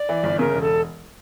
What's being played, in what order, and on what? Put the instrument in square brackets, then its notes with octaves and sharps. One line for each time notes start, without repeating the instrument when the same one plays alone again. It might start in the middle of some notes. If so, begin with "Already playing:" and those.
Already playing: [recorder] D5
[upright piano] E3
G1
[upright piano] C#3 [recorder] A#4
[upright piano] E1
[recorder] A4